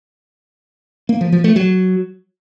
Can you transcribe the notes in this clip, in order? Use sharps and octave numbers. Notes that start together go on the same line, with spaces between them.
A#3
F3
F3
A3
F#3